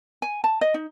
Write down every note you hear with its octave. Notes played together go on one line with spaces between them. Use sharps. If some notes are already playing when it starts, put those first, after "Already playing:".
G#5
A5
D#5
D#4